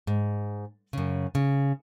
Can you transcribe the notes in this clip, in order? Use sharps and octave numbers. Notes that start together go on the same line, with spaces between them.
G#2
F#2 C#3
C#3